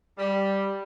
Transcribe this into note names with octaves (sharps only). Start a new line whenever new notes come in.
G3